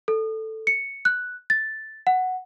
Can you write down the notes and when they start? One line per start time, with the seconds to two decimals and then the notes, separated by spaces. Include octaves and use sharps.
0.08 A4
0.67 C#7
1.05 F#6
1.50 A6
2.07 F#5